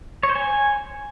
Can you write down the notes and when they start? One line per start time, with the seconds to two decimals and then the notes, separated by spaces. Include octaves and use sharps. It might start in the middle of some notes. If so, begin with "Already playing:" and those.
0.23 C#5
0.29 C5
0.36 G#5